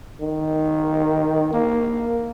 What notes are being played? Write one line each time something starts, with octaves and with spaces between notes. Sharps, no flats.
D#3
A#3